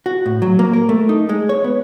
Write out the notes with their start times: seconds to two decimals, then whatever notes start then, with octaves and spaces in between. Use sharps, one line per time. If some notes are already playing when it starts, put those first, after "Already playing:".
0.06 F#4
0.26 A2
0.42 F#3
0.59 A#3
0.73 A#4
0.89 A3
1.09 D#4
1.29 G#3
1.49 C#5
1.64 B3